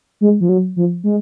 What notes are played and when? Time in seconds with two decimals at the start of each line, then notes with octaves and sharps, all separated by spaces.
0.21 G#3
0.41 F3
0.49 F#3
0.76 F3
1.04 G#3